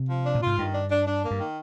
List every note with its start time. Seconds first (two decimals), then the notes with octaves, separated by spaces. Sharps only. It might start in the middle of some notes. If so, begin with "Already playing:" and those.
Already playing: C3
0.09 F3
0.25 D4
0.35 A#2
0.42 G#2 F4
0.58 G2 D#3
0.74 D4
0.90 D4
1.07 D4
1.23 A#3
1.31 G2
1.39 D#3